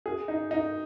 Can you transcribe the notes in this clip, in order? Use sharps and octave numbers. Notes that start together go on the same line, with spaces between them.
G#4
D#4
D#4